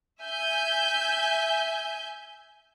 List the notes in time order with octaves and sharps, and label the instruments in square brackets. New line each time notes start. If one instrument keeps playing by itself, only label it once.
[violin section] E5 G#5 G6